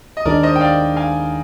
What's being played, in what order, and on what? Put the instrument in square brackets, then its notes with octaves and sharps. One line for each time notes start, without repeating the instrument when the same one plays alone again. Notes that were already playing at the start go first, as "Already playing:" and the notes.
[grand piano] D#5
[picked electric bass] D#2 D#3 G#3 D4 [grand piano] A#4 D5
[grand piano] C5 D#5
G5
D5 F5
F5 G#5